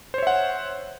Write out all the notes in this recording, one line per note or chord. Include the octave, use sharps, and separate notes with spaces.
C5 C#5 E5 F#5